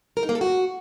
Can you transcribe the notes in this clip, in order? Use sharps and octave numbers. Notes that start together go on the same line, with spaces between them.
A#4
D#4
A#3
A4
F#4